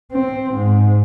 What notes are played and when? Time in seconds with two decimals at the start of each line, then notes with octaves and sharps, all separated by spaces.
0.12 C4
0.55 G#2